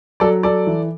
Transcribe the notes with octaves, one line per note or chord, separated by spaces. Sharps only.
F#3 A4 D5
F#3 A4 D5
E3